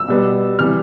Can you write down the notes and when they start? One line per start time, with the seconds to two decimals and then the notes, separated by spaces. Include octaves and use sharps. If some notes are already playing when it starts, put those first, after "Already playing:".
Already playing: E6
0.08 B2 G3 B3
0.59 C3 E3 G3 F6